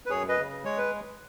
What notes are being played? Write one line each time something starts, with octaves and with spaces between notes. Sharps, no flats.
B4
F#2 G#4 C#5
B4 D#5
C#3
G#3 C#5
B4